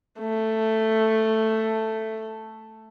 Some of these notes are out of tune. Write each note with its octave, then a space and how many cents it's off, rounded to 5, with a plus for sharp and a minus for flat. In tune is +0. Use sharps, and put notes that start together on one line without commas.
A3 +5